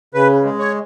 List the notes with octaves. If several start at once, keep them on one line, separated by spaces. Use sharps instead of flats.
C#3 B4
G#3
C#5